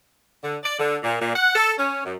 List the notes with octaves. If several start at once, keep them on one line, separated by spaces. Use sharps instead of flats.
D3
D5
D3
A#2
A#2
F#5
A4
C#4
F#2